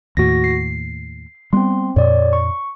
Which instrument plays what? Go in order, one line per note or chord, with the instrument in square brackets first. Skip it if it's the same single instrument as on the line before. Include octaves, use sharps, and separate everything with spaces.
[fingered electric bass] D#2 A2 [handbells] F#4 A#6
[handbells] C7
[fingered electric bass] G3 B3 [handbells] C4 C6
[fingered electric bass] F2 A#2 [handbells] C#5 D5
[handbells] C#6